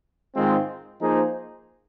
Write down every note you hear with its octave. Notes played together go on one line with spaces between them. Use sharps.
G#2 D#3 G#3 C4 F4
F3 A#3 D#4 G#4 C5